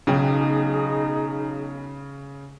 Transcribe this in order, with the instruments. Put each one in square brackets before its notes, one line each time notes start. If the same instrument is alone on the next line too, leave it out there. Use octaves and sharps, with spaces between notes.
[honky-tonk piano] B1 G5 [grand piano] C#3 [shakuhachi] D#4 [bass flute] G#4